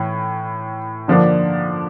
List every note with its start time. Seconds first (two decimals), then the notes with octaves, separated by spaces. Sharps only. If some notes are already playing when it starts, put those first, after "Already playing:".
Already playing: A2 E3
1.08 D3 F3 A#3 D4